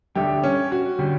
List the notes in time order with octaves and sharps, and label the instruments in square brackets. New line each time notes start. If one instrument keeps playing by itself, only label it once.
[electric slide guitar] D3 G3 D4 A4 E5 [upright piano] G4
[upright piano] C#4
F#4
[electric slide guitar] D3 G3 C#4 G4